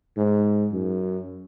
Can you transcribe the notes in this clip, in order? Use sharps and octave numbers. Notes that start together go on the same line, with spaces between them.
G#2
F#2